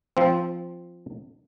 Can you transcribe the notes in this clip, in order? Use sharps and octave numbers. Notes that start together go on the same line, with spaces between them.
F3 C4